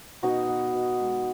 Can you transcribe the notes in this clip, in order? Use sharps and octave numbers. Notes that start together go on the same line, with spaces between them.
B2 D#4 F#4
B3
B2
G#3